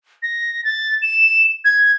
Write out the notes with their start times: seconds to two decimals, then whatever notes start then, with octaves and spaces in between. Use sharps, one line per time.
0.23 A#6
0.65 A6
1.02 E7
1.65 G#6